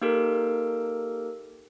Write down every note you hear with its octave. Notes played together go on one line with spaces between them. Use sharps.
A#3 D#4 G4 A4 A#4